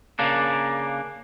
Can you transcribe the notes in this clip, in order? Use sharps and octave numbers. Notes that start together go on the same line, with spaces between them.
C#3 A#3 D4